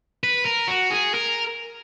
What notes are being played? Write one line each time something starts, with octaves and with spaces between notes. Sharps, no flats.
B4
A#4
F#4
G#4
A#4